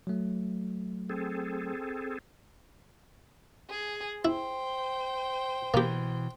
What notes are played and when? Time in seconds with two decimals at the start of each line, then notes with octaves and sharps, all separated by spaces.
0.07 F#3 A3
1.09 C4 G#4 A4
3.70 G#4
4.25 E4 C5 G5
5.74 B2 E3 A#3 G4